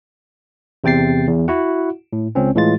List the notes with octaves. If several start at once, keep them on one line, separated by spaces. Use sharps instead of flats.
E2 C3 G5 A6 C7
E2
E4 F#4 F#5
A2
C#2 C4 C#4
A2 E3 G#3 F4 A6